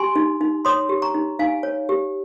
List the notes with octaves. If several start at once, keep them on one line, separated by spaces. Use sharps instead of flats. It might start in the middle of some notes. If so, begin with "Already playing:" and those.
Already playing: G4 G#5 C6
D#4
D#4
C#5 C6 D#6
G4
A#5 C#6
D#4
D#4 F5 G#5
C#5
G4